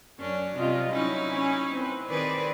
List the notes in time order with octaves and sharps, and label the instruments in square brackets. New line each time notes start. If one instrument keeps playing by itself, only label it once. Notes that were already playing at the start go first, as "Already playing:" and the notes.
[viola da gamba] F#2 D4 [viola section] C#4
[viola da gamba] C3 [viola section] G3 F4 D#5
[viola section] F#3 C#4 [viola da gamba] D#4 E4
[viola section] C#4 C#5 G#5
C4 B4
[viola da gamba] D#3 G#4 B4 [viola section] C4 D5